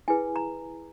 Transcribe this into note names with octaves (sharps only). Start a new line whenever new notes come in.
E4 G#4 B4 G#5
A#5